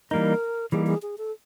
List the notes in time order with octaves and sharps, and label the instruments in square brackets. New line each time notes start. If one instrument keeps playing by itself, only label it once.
[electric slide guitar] E3 G3 A#3 D#4 [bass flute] A#4
[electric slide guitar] E3 G3 A#3 D#4 [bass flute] G#4
[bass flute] G#4
G#4
A4